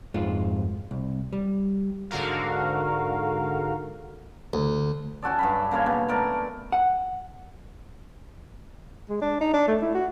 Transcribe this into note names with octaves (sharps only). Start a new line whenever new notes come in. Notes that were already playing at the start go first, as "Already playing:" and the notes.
F2 G#2 G#3 F4
C2
G3
G#2 D3 F#4 A#4 F5
D2
C#4 F#4 A4 D5
G2 F#3 B5
C#3 A#3 A#4 C#5
B2
A3 A#4 D5
F#5
G#3
D4
D#4
D4
A3
E4
F#4